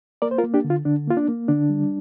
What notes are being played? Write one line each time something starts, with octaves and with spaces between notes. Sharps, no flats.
A#3 A#4 D5
C5
F4 A#4
A#3
D4 G4
D3
F4
D3 D4
A#3 F4
D4
A#3
D3 D4
G3